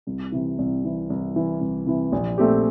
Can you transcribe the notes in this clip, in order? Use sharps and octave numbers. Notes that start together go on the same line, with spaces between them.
C2
C3 E3
C2
C3 E3
C2
C3 E3
C2
C3 E3
A#1
A#2 A3 C4 G4